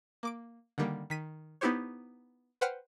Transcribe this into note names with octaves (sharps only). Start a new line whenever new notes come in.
A#3 D6 D7
D3 D#3 G3 A#3
D#3 B6 D#7
B3 D#4 E4 G4 C5 C#5
B4 C5 F#5 G5 F6